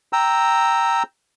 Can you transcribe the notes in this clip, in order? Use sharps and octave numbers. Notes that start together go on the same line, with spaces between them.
G5 A#5 E6